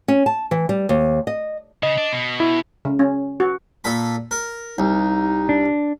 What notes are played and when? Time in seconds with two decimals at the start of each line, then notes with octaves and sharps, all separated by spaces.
0.08 C#4
0.26 A5
0.51 E3
0.69 G3
0.89 D#2
1.27 D#5
1.83 C#3 D#5
1.98 D4
2.13 B2
2.40 E4
2.85 C#3
2.99 C#4
3.40 F#4
3.84 A#2 A4 B5
4.31 A#4
4.78 C2 D#4
5.49 D4